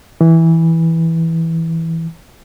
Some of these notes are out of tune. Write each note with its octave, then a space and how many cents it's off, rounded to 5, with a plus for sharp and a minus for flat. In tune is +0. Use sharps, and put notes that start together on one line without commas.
E3 -10